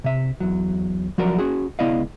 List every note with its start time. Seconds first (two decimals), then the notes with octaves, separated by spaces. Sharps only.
0.04 C3 E5
0.40 E2 F#3
1.18 F3 F#3 F#4 A#4 D5
1.38 C#4 F#4 G#4
1.79 C#2 B3 E4 D5 D#5 F5